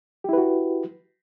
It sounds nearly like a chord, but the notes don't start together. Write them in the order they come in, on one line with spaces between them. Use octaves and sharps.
G4 E4 B4 F#4